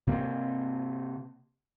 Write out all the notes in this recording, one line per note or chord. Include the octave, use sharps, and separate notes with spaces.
C3 A#3 C4